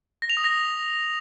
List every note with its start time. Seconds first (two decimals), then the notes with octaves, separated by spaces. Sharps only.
0.22 A#6
0.30 F7
0.37 D#6
0.44 A#6